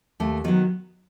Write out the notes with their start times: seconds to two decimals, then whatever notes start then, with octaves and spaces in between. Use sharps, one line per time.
0.20 D#2 A3
0.44 D#3 F#3 B3